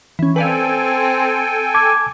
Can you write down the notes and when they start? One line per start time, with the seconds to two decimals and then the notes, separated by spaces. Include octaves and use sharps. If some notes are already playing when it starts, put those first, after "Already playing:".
0.19 E3 C#4
0.36 C4 A4 B4 D5 F5 G5 G#5
1.74 A5 D6 G#6